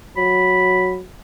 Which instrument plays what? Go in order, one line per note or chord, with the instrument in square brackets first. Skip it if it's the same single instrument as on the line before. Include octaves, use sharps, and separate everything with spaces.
[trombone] F#3 [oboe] B5